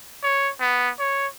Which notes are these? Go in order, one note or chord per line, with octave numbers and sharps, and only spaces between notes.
C#5
B3
C#5